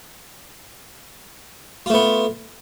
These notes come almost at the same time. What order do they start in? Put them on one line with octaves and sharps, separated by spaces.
F4 A3 B3